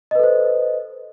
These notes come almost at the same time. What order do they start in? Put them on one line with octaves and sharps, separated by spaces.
D#5 B4 A4 C5